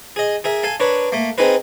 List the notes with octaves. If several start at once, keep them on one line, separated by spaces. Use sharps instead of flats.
G#4 D#5
G#4 A#4 E5
A4 F5 G#5
D4 A#4 B4 C#5
A3 A#3
C4 D#4 G#4 A#4 B4